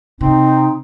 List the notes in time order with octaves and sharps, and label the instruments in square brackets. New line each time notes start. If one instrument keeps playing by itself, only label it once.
[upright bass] C3 [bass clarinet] C4 [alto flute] D#4